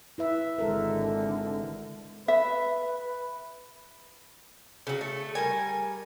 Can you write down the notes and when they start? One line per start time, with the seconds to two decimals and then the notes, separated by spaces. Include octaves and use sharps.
0.18 E4 B4 E5
0.58 G#1 D3 G#3 A4 A#4
2.28 B4 E5
4.87 C#3 F#3
5.01 A3
5.35 G3 A#4 G#5